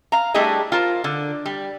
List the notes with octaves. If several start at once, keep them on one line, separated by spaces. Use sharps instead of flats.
F5 A#5
G3 A3 D4 E4 G#4 D#5
F4 A#4 C5
D3
G3